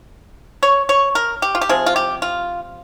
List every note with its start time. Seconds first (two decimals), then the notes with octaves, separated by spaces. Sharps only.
0.63 C#5
0.89 C#5
1.15 A#4
1.42 G4
1.55 F4
1.61 G4
1.69 C3 F3 C4 G#4
1.86 F4
1.96 G4
2.22 F4